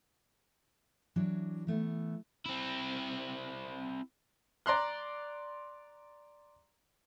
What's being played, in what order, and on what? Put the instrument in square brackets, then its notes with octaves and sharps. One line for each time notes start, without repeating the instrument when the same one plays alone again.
[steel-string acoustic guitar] E3 F#3 D4
E3 A3 B3
[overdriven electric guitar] C4 E4
[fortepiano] D5 A#5 C6 F#6